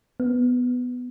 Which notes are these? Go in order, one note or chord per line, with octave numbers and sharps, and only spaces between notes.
B3